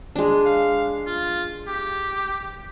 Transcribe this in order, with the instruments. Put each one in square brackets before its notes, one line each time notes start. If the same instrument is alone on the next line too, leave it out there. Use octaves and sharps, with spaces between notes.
[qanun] G#3 D4
[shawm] F5
F4
G4